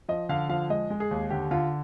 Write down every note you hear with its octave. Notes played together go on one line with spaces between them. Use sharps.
F3 D#5
D3 F5
F3 F5
G#3 D#5
G#3
G#4
D#2
D3 G4
D3 F4